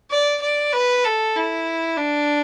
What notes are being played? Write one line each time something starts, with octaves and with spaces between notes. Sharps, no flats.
D5
D5
B4
A4
E4
D4